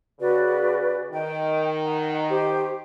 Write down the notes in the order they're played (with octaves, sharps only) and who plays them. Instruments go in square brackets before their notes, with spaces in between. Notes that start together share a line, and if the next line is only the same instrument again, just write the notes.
[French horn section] C#3 [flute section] F#4 B4 D5
[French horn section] D#3 [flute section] G5
[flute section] F#5
G4 C5